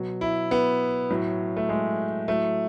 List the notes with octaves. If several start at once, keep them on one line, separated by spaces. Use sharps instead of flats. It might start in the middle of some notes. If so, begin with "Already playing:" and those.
Already playing: B2 F#3
E4
B3
A2 F#3
A3
G#3
A2 F#3 A3